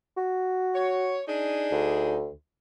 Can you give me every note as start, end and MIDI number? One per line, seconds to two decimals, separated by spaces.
0.17 1.18 66
0.74 1.20 73
1.28 2.15 62
1.28 2.15 63
1.28 2.15 68
1.71 2.31 38